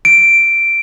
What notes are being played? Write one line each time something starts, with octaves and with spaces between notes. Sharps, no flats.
D7